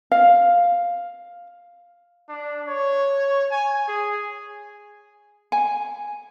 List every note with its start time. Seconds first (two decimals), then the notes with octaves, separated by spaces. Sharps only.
0.12 F5
2.29 D4
2.67 C#5
3.51 G#5
3.88 G#4
5.52 G#5